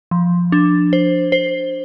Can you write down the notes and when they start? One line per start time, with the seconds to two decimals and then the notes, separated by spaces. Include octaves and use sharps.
0.11 F3
0.52 D4
0.93 C5
1.32 C5